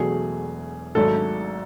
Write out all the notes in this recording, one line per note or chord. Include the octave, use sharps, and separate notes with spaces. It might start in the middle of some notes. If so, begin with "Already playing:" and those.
Already playing: E1 E2 B2 F#3 A3 G#4
G#1 G#2 F#3 A3 A4